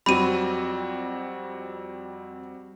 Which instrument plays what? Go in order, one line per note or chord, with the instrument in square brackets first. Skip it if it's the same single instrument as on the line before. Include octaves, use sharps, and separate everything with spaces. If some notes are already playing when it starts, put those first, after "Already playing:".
[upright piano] F2 F#3 [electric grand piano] G3 C4 F#4 [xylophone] B5 D#7